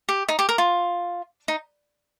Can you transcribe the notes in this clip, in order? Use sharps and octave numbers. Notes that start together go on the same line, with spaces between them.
G4
D#4
G4
A#4
F4
D#4